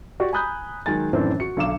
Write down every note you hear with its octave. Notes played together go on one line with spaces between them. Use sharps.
F#4 G4 D5
G#5 A#5 B5 D#6 F#6 G6
D#3 F#3 G#3 G#5 A6
F#2 A2 D#3 E3 C4 D4
F#4 C#7
B1 D3 F5 D6 E7